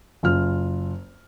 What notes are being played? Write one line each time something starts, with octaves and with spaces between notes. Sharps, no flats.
F#1 F4 F6